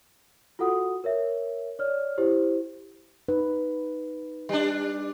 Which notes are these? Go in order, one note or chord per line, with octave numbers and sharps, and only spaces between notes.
F4 F#4 A4 F#5 D#6
A#4 C#5 E5
C#5 D5 F6
E4 G4 C5
D#4 B4
G3 D4